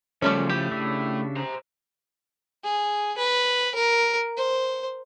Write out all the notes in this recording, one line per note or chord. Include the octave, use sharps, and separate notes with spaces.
F#2 A#2 C#3 F3 G3 A3 C#4
A2 A3 G4
C#3 D4 E5
C5 A#5
G#4
B4
A#4
C5